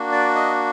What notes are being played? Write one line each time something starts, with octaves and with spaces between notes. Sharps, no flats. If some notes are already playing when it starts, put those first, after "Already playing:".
Already playing: A#3 D4 F#4
D5
D#5